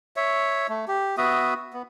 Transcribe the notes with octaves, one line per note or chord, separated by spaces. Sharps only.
C#5 E5
A3
G4
B3 F#4 E5 D#6
B3